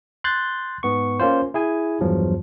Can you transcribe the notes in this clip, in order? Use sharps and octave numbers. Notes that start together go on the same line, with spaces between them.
C6 F#6 G6 A6
G#2 B3 C#6
A#3 C#4 F4 C5
E4 G#4 G#5
E2 G2 F3 F#3